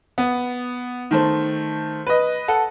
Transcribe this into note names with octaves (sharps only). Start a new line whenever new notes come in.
B3
D#3 A3 C5
B4 D#5
A4 F#5